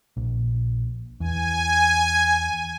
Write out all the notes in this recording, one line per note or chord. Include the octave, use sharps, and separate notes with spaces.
A#1
E2 G#5